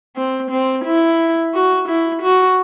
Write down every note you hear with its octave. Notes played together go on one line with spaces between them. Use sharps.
C4
C4
E4
F#4
E4
F#4